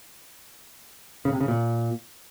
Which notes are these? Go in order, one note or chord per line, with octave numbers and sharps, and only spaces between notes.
C#3
C3
C#3
A#2